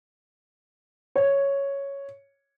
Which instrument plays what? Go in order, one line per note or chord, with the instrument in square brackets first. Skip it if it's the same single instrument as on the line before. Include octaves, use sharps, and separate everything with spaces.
[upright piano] C#5